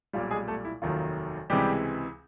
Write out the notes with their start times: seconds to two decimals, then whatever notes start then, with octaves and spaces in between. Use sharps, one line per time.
0.13 B1 A#2 G3 F4
0.31 G#3 G#4
0.48 A3 A4
0.65 E4
0.82 F1 D#2 D#3 F#3 F4
1.50 C#2 C3 E3 G3 G#3 G4